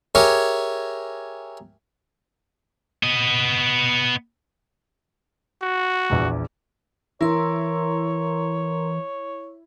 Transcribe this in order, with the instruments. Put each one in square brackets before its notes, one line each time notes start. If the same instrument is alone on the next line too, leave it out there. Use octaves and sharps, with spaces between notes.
[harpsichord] G4 G#4 A#4 C#5 E5 G#5
[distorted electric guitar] B3 D#5
[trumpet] F#4
[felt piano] A#1 E2
[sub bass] E3 [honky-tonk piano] E4 [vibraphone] A#4 A#5 C6 [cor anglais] C#5